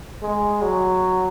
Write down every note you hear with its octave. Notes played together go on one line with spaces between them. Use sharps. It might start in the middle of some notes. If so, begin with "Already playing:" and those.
G#3
F#3